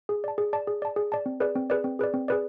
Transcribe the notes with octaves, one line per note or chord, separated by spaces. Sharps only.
G#4
D5 A5
G#4
D5 A5
G#4
D5 A5
G#4
D5 A5
C4
G#4 B4 D5
C4
G#4 B4 D5
C4
G#4 B4 D5
C4
G#4 B4 D5